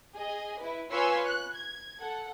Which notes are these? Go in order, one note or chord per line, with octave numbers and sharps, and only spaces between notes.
G#4 D#5
E4 B4
F4 B4 C#5 G#5 C6 E6
F#6
G#6
A4 F#5